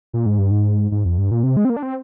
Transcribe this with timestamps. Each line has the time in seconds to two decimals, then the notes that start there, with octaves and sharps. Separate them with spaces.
0.13 A#2
0.26 G#2
0.39 G2
0.51 G#2
0.92 G#2
1.05 F2
1.18 G2
1.31 A#2
1.43 C3
1.57 G#3
1.65 C4
1.70 A#3
1.77 D4
1.82 C4